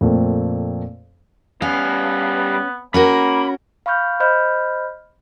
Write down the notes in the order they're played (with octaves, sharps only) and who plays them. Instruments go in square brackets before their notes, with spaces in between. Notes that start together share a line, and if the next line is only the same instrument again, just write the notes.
[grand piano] F2 A#2 A3 C4
[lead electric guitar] G3 F5 [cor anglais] B3 [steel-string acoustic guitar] C#4
[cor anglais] A#3 [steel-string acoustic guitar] C#4 F#4 A#4 [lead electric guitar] B5
[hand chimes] F5 B5 C#6 F6 G6
C5 D#5 B5 F6 G6